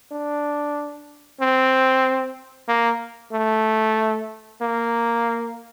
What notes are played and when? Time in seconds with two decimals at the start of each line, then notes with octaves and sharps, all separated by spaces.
0.11 D4
1.40 C4
2.68 A#3
3.32 A3
4.61 A#3